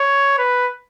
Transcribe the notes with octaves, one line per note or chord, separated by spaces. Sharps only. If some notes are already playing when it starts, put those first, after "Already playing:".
Already playing: C#5
B4